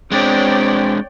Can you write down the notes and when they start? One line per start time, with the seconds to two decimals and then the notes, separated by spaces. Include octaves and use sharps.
0.12 G#3 C4 D4 C#5 D5 G5